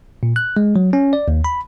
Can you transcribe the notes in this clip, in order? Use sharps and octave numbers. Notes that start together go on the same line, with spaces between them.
A#2
F#6
G#3
F#3
C#4
D5
D#2
B5